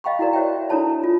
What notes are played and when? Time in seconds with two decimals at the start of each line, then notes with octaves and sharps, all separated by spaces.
0.04 D#5 F5 G5 B5 C#6
0.19 E4 F#4 A#4 D5
0.33 F#4 C5 C#5 E5 G5
0.69 D4 E4 A4 C#5 A5 B5
1.01 F4 A4